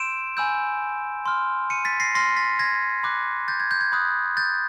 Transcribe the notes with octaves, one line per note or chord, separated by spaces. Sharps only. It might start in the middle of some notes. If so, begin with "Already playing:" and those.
Already playing: C6 E6 G6 D7 E7
G#5 B5 E6 G6
C6 F6
C#7 D#7
A6 B6
A#6 C7
C6 F6 A#6 C7
A6 B6
G#6 A#6
B5 D6 F#6
G6 A6
G#6
G6
G#6
B5 D#6 F#6
G6 A6